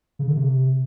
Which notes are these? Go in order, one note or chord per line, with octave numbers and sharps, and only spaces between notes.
C#3
D3
C3